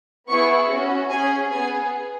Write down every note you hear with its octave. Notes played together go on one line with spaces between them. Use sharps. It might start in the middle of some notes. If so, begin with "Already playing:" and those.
B3 E4 G#4 C#6
C#4 F#4
C#4 G#4 G#5
B3 G#4 G#5